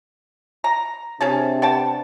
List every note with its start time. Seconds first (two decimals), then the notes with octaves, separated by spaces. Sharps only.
0.64 A#5
1.21 C3 C#4 D4 G#4 A5
1.62 B3 G5 A5